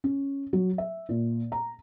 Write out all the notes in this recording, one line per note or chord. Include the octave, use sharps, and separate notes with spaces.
C#4
F#3
E5
A#2
A#5